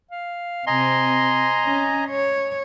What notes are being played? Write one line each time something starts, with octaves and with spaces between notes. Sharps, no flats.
F5
C3 C4 D#5 G#5 A#5 C6
C#4
C#5